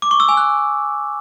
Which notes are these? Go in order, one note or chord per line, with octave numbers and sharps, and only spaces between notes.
D6
C#6
E6
G#5
F#6